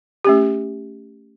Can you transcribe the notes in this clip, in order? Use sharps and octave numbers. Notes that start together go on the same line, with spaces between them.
A3 C#4 G4